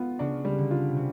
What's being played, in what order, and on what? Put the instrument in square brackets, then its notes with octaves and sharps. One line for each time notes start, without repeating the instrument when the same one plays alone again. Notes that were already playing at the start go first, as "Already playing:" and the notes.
Already playing: [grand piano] B3 F4
[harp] C#3 [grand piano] D4
[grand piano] G3
[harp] D3
[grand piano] F4
[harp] C3
C#3